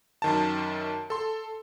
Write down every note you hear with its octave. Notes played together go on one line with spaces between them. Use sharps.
F#2 D#3 A5
A4 C6